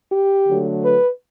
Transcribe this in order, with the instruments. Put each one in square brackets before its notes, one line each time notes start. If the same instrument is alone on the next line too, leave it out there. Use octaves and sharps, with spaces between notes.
[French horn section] G4
D3 F#3 A3
B4